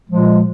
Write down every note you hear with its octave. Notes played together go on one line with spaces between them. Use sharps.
A#2 F3 G#3